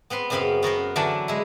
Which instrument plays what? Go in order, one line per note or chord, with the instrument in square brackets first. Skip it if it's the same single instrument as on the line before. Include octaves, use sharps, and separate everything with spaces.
[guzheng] B3 C4 B4 C6
F#2 C#3 B3 C4 F5 B5
B3 F#4 A#4 C5
D3 E3 F#3 D4 G5 A5
G#3 E4